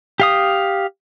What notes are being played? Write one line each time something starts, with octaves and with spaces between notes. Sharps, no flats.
G4 F5 D#6